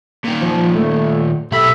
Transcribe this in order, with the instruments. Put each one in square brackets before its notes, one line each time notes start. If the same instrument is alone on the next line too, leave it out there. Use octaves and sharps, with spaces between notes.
[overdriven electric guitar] A#2 D#3
[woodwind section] F3
A3
[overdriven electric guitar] B1 B5 [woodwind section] G4 A4 E5